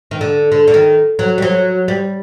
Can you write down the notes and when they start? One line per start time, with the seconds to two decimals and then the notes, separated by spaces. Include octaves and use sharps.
0.11 D#3
0.21 D3
0.52 D3
0.68 D3
0.74 D#3
1.19 F#3
1.38 G3
1.42 F#3
1.88 G3